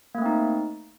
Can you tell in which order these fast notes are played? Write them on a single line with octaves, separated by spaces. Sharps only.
A#3 A3 C4 D#4